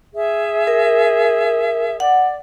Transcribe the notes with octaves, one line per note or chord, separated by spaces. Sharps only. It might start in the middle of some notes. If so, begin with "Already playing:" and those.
G#4 E5
A#4
D5 F#5